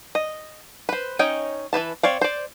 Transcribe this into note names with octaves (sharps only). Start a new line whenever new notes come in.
D#5
B4 C5
C#4 D#4 C#5 D#5 G5
E3 F3 B4 A5
C4 C#5 D5 F5
C5 D5